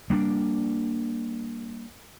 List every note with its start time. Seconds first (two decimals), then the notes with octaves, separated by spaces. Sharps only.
0.10 G3 A#3 D4